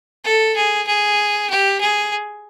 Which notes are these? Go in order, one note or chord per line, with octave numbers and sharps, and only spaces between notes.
A4
G#4
G#4
G4
G#4